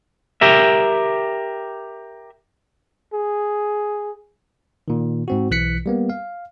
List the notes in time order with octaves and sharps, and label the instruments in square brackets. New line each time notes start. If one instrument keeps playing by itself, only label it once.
[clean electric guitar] G4 A#4 E5
[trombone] G#4
[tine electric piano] A#2 D#3
G#2 C4 F#4
B1 E3 F#6 B6 C#7
G3 A#3 B3
F5